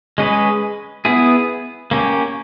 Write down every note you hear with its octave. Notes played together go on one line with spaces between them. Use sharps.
G#3 C#4 G#4 B4
B3 E4 G#4
A#3 C#4 G4